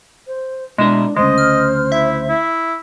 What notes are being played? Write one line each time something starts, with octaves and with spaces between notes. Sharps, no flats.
C5
B2 G#3 D4 E4 A#4
D2 A2 C#3 G#3 C5 D#5
F6
E4 E5
E4